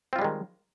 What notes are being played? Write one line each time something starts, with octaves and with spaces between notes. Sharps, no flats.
D#3 G3 G#3 C4 F4